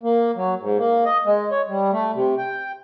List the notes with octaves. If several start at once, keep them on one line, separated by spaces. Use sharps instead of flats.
A#3
F#3
G#2
A#3
D#5
G#3
C#5
G3
A3
C3
G5